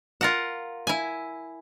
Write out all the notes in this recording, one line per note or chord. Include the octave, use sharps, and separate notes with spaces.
F4 A#4 F#5
E4 G#5